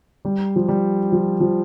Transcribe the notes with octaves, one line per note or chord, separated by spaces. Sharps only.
G3
F3
G3
F3
F3